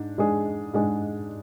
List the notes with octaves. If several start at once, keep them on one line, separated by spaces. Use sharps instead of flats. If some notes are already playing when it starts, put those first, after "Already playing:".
Already playing: G#2 D4
G#2 G#3 D4 G#4
G#2 G#3 D4 G#4